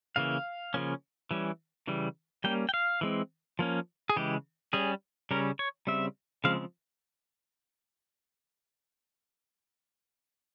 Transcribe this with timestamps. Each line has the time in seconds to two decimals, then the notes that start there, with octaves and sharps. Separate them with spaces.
0.16 C#3 E3 A#3 F5
0.74 C#3 F3 A#3 C#4
1.31 E3 G3 C#4
1.87 C#3 E3 G3
2.44 G3 A#3 C#4 G5
2.69 G5
2.74 F5
3.01 E3 G#3 C4
3.59 F3 A#3 C#4
4.10 G#4
4.17 C#3 E3 G#3 G4
4.73 G3 C#4 G#4
5.31 C#3 G3 C#4 A#4
5.59 C#5
5.87 C#3 G3 C4 E5
6.44 C#3 F3 G#3 C4 F5